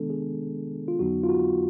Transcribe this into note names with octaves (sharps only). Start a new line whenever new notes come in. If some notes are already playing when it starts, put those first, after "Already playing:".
Already playing: C3 D#3 G#3 B3 D4 A4
G#4
F4
F2 D3 F#3 B3 D#4 F#4
F4
F#4